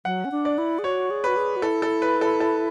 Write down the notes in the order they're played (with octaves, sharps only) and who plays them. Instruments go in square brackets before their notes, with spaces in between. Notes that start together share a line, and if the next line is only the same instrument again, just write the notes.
[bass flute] F#3 [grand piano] F#5
[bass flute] C#4
D4
[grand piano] D5
[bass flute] E4
G#4
[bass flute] F#4 [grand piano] C#5
[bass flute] G#4
[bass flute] F#4 [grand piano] B4
[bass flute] G#4
F#4
[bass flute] E4 [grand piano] A4
[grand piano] A4
B4
A4
A4